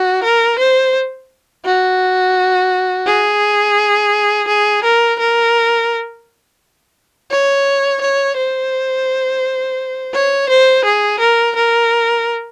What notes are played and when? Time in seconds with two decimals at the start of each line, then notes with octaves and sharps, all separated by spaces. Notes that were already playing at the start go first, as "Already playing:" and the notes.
Already playing: F#4
0.23 A#4
0.59 C5
1.65 F#4
3.06 G#4
4.48 G#4
4.84 A#4
5.19 A#4
7.31 C#5
8.01 C#5
8.37 C5
10.14 C#5
10.49 C5
10.85 G#4
11.20 A#4
11.56 A#4